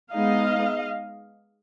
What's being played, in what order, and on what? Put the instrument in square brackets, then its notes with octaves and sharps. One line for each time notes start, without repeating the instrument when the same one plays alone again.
[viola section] G#3 B3 D#4 D#5 F5